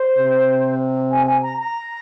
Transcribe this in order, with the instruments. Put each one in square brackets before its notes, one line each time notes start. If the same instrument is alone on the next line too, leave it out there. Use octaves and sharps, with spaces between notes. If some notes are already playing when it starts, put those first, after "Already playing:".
Already playing: [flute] C5
[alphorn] C3
[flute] G#5
G#5
A#5
A#5